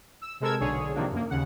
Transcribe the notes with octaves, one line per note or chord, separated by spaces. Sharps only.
E6
C3 G#3 A4 A#4 E6 G#6
B1 D3 G#4 C#5
C3 D#3 F3 A#3 D4
F#2 A#3
D#2 C#3 F#5